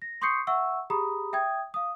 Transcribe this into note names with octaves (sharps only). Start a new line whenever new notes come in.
A#6
C6 C#6 D#6 G6 C7 C#7
E5 F#5 C#6 E6
G4 G#4 A#5 B5 D#6
E5 G5 D#6 G#6
F5 D#6